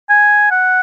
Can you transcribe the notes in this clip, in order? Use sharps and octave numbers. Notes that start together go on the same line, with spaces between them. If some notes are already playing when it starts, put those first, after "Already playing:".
G#5
F#5